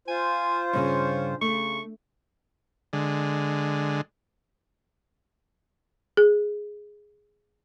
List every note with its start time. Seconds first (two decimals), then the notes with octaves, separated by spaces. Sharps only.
0.08 F4 C5 G#5
0.73 G2 C#3 G#4 C#5
1.41 C#3 A3 C#6
2.93 D3 G#3
6.17 G#4